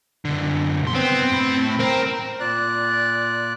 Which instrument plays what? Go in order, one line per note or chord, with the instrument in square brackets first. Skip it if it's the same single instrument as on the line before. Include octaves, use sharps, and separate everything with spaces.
[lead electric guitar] F#2 D3
C2 C6
[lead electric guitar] B3 [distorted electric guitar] C4
[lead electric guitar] A2 B5
[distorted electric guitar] C4 [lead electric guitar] A#4 A#5
[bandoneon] A#2 D5 F#6